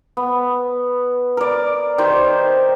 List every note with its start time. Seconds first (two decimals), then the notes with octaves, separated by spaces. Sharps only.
0.17 B3
1.37 A#4 D5
1.98 D#3 G4 C5